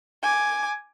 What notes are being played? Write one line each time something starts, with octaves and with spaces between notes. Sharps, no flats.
G#5 D6